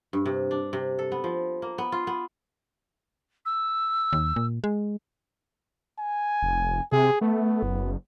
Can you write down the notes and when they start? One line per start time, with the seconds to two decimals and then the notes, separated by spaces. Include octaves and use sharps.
0.13 G2
0.26 C3
0.51 D4
0.73 C3
0.99 A4
1.12 B3
1.24 F3
1.62 A#3
1.78 B3
1.92 F4
2.07 B3
3.45 E6
4.13 D#2
4.36 A#2
4.64 G#3
5.99 G#5
6.42 F1
6.92 C3 G#4
7.21 A3 B3
7.63 F#1